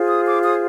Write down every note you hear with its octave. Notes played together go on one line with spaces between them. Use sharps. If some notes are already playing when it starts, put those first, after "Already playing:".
Already playing: F4 G#4 C5
D#6
D6
D#6